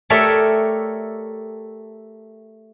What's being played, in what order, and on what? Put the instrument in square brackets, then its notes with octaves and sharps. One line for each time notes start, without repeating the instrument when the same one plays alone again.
[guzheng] A3 G4 A#4 C#5 D5 E5